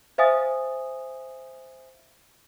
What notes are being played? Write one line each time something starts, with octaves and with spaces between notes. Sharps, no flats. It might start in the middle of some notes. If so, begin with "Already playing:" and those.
C5 E5 F5 G#5 D#6 A6